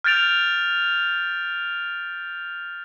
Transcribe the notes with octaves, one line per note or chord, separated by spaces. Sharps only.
F6 G6 A6 D7 F7